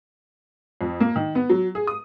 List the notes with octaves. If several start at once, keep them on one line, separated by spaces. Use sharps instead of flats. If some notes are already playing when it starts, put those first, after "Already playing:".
F2
A#3
D#3
B3
F#3
G#4
D#6